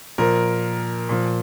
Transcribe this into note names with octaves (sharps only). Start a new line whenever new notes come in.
A#2 F3 A#4
A#2 F3